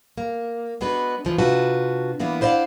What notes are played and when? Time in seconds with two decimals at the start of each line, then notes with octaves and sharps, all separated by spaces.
0.18 A#3
0.81 G#3 B3 D4 F#4 B4
1.25 E3 F3 G#3
1.38 C3 D4 F4 F#4 B4 A5
2.19 E3 A#3 B3 D4 E4
2.41 E4 C5 D5 D#5 F5 F#5